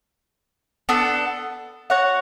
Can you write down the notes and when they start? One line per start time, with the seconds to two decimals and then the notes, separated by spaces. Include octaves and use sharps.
0.89 B3 D4 A4
1.90 F#4 C#5 F#5